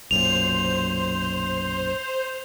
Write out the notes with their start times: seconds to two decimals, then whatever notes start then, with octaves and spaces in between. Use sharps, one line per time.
0.11 B1 F#2 A#2 C5 F7